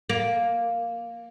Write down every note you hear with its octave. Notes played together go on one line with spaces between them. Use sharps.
A#3